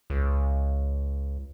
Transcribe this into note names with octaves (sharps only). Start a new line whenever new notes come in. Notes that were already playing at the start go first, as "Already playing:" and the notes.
C#2